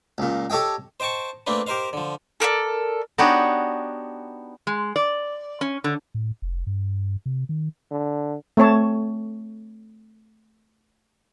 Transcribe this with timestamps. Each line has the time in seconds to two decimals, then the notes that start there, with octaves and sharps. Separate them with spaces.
0.18 C#2 A#2
0.50 G4 A4 C#5 D#5 G5
1.00 C5 D#5 G5 A5 C#6
1.47 A3 A#3 C4 D4 B4
1.67 G4 A#4 C5 D#5 F5
1.93 D3 F3
2.40 A4 A#4 C5 D5
3.18 B3 D4 D#4 F#4 G4 C#5
4.67 G#3
4.96 D5
5.61 C#4
5.84 D3
6.14 A2
6.42 F1
6.67 G2
7.26 C3
7.49 D#3
7.91 D3
8.57 A3 C4 C#5 A5